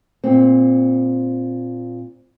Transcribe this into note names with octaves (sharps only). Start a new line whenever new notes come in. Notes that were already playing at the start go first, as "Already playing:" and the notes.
A#2 C4